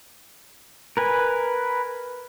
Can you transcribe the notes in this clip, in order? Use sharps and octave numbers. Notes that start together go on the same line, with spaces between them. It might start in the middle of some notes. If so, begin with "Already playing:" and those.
A#4 B4 G#5